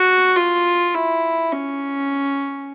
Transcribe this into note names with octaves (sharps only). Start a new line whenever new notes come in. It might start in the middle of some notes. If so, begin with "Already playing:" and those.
Already playing: F#4
F4
E4
C#4